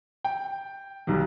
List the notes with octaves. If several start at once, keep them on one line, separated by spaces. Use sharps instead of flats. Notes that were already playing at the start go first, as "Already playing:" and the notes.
G5
B1 D#3 G3